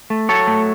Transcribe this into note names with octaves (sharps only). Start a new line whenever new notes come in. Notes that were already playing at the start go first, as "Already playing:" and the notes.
A3
F#3 A4 C#5
A3